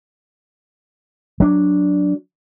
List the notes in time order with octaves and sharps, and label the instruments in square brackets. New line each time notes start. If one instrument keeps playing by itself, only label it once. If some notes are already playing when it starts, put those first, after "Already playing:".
[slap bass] F#3 D4